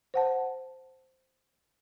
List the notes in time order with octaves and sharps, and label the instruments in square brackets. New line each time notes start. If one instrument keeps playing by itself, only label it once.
[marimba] C5 F#5 A5